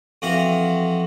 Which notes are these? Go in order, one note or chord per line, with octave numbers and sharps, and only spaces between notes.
F2 E3 F#4 F5